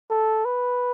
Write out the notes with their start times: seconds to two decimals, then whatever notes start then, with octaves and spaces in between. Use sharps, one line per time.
0.10 A4
0.45 B4